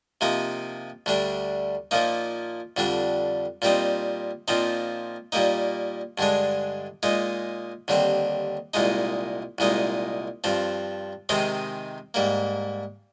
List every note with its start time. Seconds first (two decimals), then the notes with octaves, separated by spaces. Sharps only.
0.21 C3 F3 A#3 D#4
1.06 D2 D3 G3 D4
1.91 A#2 F3 A#3 D#4
2.77 F2 D3 G3 D4
3.62 A#2 G3 C4 D#4
4.48 A#2 F3 C4 D#4
5.32 A#2 G3 A#3 D#4
6.18 G2 D3 G#3 D4
7.03 A#2 G#3 D#4
7.88 D#2 D3 G3 C4
8.74 C2 A#2 G#3 D#4
9.58 C2 A#2 G#3 D#4
10.44 G2 F3 C4
11.29 C3 D#3 G#3 C4 D#4
12.14 G#2 G3 A#3